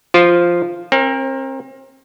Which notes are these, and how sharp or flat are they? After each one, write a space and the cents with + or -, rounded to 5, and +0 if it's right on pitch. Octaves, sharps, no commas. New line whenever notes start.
F3 -5 F4 +0 C5 +0
C4 +35 A#4 +0